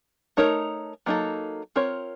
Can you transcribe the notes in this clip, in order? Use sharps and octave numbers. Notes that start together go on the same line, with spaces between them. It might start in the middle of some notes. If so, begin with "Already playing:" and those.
A3 D#4 A#4 C#5
F#3 A#3 D#4 A4
C4 F4 A#4 C#5